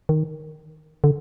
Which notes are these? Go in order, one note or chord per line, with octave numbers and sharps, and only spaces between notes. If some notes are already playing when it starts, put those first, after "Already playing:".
D#3
D3